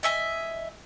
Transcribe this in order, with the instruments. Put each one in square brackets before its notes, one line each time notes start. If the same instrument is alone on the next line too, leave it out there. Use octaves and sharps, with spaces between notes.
[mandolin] D#5 E5 G#5